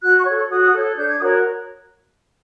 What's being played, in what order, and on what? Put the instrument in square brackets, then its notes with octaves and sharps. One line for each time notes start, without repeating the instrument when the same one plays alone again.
[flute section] F#4 F#6
C#6
A4 C#5
F#4 D#6
D#6
A4 G6
C#5
D4 G6
G#6
F#4 A#4 C#5 D#6